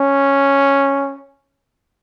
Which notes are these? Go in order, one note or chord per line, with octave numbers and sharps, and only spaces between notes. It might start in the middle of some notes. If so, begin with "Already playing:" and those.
Already playing: C#4